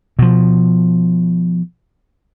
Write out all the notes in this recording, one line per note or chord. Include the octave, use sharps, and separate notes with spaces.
B2 F3